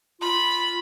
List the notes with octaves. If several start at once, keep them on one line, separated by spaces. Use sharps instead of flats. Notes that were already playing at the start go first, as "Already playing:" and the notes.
F4 B5